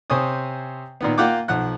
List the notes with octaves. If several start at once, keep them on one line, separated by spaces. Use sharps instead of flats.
C3 C5 C#5 G#5 D#6
A#2 D#3 B3
A#3 F4 F#5 G5 D6
B1 F3 F#5 F#6